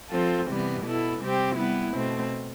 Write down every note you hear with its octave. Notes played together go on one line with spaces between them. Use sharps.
F3 C4 F4 A4
C3 E3 G3 B3
B2 B3 E4 A4
C3 G3 C4 G4
G3 B3 E4
B2 A3 C4